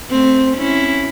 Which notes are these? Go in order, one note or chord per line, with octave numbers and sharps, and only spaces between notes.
A3 C4
C#4 E4